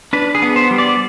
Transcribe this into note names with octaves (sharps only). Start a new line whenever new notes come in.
D4 B4
G#4
B3
C5
G3
D5